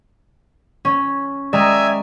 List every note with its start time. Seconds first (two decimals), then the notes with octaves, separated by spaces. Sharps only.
0.85 C#4
1.53 G#3 D5 E5 G5 G#5 A#5